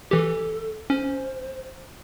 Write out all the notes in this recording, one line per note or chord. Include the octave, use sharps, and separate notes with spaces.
E3 G4 A4
C#4 C5